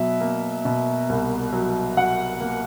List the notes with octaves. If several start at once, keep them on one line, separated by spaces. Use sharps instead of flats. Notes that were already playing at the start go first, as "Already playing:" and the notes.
Already playing: B2 F#3 E5
A#3
B2
C2
F#3
F#3 F#5
A#3